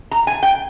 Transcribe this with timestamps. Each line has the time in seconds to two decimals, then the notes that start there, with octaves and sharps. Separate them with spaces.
0.11 A#5
0.27 G#5
0.43 G5